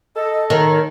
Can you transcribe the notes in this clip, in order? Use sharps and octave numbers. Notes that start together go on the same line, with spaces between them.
A4 D#5
D#3 C#5